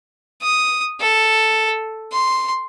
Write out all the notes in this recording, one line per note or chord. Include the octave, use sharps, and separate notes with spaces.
D#6
A4
C6